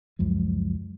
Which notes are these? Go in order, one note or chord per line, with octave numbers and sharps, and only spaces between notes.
C#2 F#2 F3 G#3